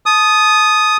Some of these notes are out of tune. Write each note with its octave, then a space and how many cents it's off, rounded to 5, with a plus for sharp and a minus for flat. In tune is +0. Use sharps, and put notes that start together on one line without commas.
A5 -30 D#6 +0